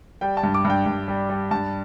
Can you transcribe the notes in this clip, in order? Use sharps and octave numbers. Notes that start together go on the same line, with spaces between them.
G3 G5
A5
G2
D6
G2 G5
G2
G3
G3
G2 A5